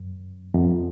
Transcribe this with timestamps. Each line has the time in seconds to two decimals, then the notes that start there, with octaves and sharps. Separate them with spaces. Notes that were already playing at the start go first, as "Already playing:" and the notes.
Already playing: F#2
0.54 F2